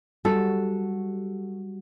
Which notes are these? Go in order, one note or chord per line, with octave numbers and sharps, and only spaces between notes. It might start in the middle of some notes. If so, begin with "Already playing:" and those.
G3 F#4 A4